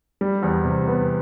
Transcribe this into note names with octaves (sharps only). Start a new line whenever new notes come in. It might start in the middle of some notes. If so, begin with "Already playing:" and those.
G3
E2
C3
B3